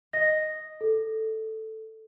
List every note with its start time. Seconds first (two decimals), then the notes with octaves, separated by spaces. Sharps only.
0.13 D#5 A#6
0.81 A4